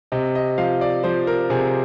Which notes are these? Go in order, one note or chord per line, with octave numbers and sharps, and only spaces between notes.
C3 D#5
D#5
F3 F5
D5
F3 C5
A#4
C3 G#4